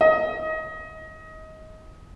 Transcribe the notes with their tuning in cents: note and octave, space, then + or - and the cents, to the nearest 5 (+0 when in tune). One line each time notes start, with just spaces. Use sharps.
D#5 +20